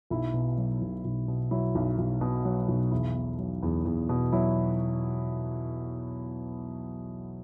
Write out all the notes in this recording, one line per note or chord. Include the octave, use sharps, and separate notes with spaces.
B1 E4
B2
F#3
B1
B1
B2
F#3 E4
B1
B1
B2
F#3
B1
E2 E4
B2
F#3
E2
E2
B2
F#3 E4